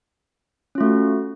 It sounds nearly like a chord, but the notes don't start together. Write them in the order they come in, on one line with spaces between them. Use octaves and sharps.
C#4 F4 A3 F#4